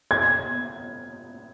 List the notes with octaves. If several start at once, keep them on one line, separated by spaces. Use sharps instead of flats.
G#6